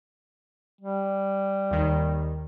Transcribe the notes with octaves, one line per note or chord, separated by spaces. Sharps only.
G3
D#2 D#3